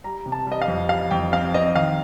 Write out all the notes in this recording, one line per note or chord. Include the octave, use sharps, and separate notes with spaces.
G3 A#5
C3
A5
G3 D#5
F5
F2
G3 F5
F2 G5
C4 F5
C4 D#5
D#3 F5